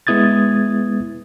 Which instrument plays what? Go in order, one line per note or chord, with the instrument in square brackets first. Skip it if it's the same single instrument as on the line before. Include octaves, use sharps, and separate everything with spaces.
[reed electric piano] G#3 B3 E4 D#6 G#6 A6